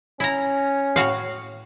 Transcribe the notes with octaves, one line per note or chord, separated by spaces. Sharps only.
C#4 E4 A#5
A2 F#4 F5